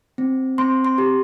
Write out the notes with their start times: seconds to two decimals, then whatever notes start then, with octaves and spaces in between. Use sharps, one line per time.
0.18 C4
0.58 C4 C6
0.85 C6
0.98 G4